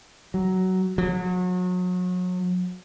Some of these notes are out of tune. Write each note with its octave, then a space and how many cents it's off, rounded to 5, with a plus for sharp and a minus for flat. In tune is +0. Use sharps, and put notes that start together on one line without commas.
F#3 +15
F#3 -35